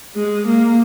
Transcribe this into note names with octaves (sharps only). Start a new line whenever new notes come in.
G#3
A#3